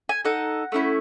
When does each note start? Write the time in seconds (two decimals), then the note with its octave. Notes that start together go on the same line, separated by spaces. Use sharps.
0.09 G#5
0.25 D#4 A4 F#5
0.72 A3 C#4 E4